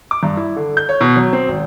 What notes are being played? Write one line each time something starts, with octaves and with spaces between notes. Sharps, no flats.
D6
G2
E4
D3
G6
C#5
B2
F#3
C4
G#1